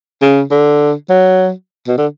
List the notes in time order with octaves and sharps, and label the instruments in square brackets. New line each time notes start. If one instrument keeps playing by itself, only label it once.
[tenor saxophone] C#3
D3
F#3
B2
D3